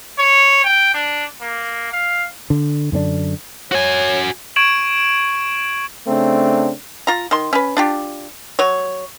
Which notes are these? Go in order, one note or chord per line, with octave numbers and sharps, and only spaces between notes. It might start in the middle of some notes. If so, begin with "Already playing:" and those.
C#5
G5
D4
A#3
F5
D3
F#2 D3 C4 D4
F#4 C#5 G#5
C#6 G#6 D7 E7 F#7
C#3 A3 C4 D4
F4 A#5
D#3 C6
C#4 B4
D4 F4 G4
F#3 C#5